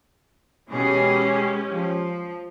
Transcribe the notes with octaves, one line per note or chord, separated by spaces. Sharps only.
B2 E3 G#3 C#4 G4 G#4
F3